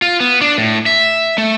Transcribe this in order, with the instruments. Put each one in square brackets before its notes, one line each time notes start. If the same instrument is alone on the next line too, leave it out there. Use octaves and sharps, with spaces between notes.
[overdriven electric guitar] F4
B3
D4
A2
E5
A3